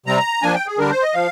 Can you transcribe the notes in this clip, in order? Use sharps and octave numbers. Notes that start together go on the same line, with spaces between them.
C3 G3 C4 A#5
F3 A#3 D4 G#5
G5
G#4
D3 G3 D4 A#4
C5
D#5
F3 F5